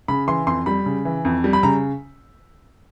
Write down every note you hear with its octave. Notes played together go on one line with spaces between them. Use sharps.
C#3 B5
E3 C6
F2 C6
G3 B5
C#3
E3
F2
G3
B5
C#3 A#5